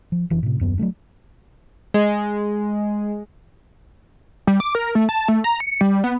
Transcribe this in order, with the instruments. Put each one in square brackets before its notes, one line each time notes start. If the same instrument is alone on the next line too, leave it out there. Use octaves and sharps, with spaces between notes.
[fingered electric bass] F3
F1 E3
A2 C3
D#1 F#2 B3
F#3 G3 A3 D4
[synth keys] G#3
[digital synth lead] G3
D6
A#4
A3
A5
A3
A#5
C#7
G3
B3